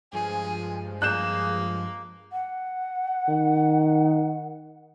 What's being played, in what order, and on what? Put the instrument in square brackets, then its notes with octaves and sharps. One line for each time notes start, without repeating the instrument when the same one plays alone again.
[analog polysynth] G2 F3 G#3 [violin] G#4 [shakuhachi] G#5
[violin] A#3 [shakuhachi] G#4 [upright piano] F#6 G6 E7
[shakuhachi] F#5
[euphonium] D#3